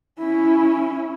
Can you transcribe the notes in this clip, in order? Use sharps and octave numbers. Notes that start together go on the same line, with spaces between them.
C#4 E4